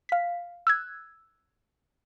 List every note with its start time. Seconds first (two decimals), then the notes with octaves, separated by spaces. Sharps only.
0.09 F5 B6
0.67 E6 F#6 G#6